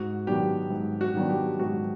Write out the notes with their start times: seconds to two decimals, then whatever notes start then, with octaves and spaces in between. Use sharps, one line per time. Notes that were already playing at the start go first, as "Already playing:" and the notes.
Already playing: G#2 F#4
0.26 D#3 F#3 B3 D4 G4
0.70 G#2
1.01 F#4
1.15 D#3 F#3 B3 D4
1.30 G4
1.59 G#2 F#4